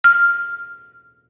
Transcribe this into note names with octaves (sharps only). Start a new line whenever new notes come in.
F6